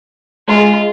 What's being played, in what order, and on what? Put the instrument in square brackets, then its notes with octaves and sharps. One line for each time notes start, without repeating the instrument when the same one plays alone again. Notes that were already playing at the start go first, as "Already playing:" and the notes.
[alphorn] G#3 [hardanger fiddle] F4